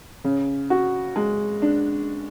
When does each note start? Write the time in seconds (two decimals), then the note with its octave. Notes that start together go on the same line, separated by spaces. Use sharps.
0.24 C#3
0.70 F#4
1.16 G#3
1.62 D4